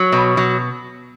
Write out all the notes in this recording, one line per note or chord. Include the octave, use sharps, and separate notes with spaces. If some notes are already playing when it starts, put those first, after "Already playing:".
Already playing: F#3
B2
F#3